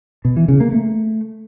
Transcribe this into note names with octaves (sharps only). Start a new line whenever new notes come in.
B2
E3
C#3
A#3
A3